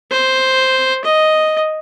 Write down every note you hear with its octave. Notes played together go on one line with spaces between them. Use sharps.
C5
D#5